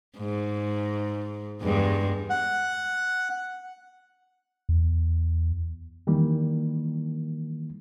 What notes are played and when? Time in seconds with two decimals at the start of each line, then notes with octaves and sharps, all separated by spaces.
0.17 G#2
1.62 E2 G2 G#3
2.30 F#5
4.69 E2
6.07 D#3 E3 G3 A#3